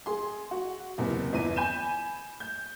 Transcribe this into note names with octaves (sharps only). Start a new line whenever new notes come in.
G#4 C6
F#4
F#1 E2 C3 B3
G1 E2 D#7
G#5 B5 G6 D#7 E7
G6